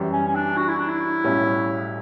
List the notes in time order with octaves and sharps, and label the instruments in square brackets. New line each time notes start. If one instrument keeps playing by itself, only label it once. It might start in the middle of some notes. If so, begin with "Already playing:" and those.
Already playing: [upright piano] F#2 E3 G3
[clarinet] C#4
C#4
D4
F#4
E4
D4
E4
[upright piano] B1 A2 G3 C#4